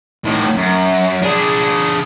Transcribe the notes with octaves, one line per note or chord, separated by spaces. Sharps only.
A2 D#3
F#2
D4 G#4